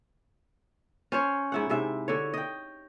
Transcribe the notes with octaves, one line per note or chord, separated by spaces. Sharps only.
C#4 C5 C#5
G#2 E4 F#5
G#2 C3 E5
D3 C#5
D#5 G5